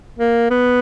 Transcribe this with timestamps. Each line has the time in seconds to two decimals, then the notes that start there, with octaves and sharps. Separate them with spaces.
0.19 A#3
0.51 B3